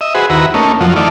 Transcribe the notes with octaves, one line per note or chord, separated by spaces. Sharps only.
D#5 E5
F#4 G#4 B4 C5
D#2 E4 F#4 B4 A#5
A3 A#3 C#4 D#4
F2 F3 F#3
E3 A3 D#4 F4 D5